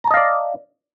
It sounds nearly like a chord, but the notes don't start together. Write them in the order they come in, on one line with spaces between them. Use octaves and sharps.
A#5 A5 D#5 F5 D5